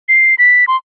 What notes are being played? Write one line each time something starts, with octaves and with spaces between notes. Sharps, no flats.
C7
B6
C6